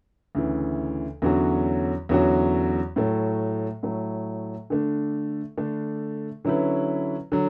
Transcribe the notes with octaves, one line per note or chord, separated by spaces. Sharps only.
D2 C#3 E3
E2 D3 F#3 C#4 F#4
E2 D3 F#3 C#4 F#4
A2 F#3 A3
A2 F#3 A3
D3 A3 D4
D3 A3 D4
D3 F#3 C#4 E4 B4
D3 F#3